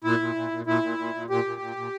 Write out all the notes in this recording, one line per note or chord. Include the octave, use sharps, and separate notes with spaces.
A#2 E4
A#2
A#2
A#2
A#2 E4
A#2
A#2
A#2
A#2 G4
A#2
A#2
A#2